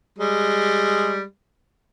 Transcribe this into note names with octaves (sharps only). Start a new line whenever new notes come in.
G3 G#3